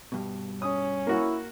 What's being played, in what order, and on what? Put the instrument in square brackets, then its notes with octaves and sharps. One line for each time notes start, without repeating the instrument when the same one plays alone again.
[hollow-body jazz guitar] G2 B2
[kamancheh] C#4 [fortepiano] D#6
[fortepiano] A#3 F#4 [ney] E4